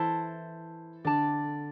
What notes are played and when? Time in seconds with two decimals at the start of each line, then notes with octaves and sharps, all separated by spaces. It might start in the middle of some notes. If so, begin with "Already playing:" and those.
Already playing: E3 E4 A4 C5 A5
1.05 D3 D5 A5 D6